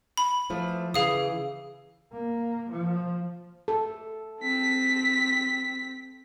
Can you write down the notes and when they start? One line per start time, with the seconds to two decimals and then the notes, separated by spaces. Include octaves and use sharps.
0.17 B5
0.50 E3 F3 A3
0.94 C#3 E3 G#4 F5 D#6
2.13 A#3
2.71 F3
3.68 A4
4.41 C4 B6